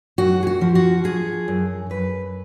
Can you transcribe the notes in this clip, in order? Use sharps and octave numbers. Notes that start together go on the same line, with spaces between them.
F#2 F#4
G#4
F#4
F3
F#4
F3 G#4
F#2
F#2 B4